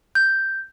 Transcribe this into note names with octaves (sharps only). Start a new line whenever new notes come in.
G6